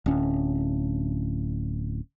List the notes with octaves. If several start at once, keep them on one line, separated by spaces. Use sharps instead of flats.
D1 C#4